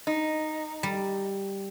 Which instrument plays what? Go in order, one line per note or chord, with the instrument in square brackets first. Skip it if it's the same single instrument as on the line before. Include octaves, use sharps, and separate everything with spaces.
[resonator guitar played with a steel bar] D#4
[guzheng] G3